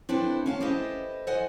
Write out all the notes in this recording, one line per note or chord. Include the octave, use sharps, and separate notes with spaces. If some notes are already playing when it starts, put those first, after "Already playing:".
C4 D4 E4 A4 B4 C5
C#4 F5 F#5 A5
E4 G4 A4 B4 C5 D#5
A4 C5 D#5 F#5 G#5